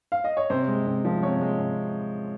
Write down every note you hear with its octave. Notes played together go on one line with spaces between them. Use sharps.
F5
D#5
C#5
C3 C5
G#3
C3
F3
C3 C#5
G#3
C3